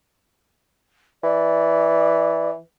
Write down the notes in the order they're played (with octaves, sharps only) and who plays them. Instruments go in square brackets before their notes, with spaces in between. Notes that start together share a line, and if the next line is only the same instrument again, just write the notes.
[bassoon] E3 [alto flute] D5